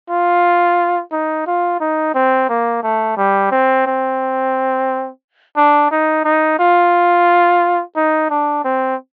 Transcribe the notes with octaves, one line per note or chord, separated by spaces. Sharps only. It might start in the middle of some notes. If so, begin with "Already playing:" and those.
F4
D#4
F4
D#4
C4
A#3
A3
G3
C4
C4
D4
D#4
D#4
F4
D#4
D4
C4